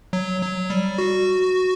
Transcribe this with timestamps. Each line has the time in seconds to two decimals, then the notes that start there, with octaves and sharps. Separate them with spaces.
0.13 F#3
0.42 F#3
0.70 G3
0.98 F#4